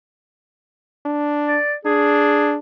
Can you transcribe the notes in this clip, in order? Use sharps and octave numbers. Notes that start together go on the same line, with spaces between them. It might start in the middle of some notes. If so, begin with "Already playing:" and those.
D4
D5
D4 G#4